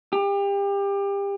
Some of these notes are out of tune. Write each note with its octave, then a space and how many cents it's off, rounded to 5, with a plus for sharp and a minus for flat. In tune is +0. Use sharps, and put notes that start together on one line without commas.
G4 +30